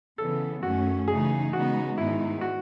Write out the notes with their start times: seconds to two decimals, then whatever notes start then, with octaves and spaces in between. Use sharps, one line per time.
0.18 C#3 E3 B3 A4
0.63 F#2 D#3 A3 C#4 F#4
1.08 C#3 E3 A3 D#4 G#4
1.53 C#3 G#3 B3 D#4 F#4
1.98 G#2 D#3 G#3 B3 D#4 E4
2.41 F#4